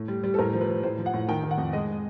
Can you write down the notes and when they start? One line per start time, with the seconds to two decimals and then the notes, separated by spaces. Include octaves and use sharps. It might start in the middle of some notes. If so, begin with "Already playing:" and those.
Already playing: A2
0.08 G3
0.24 G3
0.34 A4
0.39 A2 A#4
0.53 F3
0.61 B4
0.68 F3
0.83 A2 C5
0.98 F3
1.06 F#5
1.13 A2
1.28 D#3 G5
1.43 D#3
1.51 F#5
1.58 F2
1.73 G#3 D#5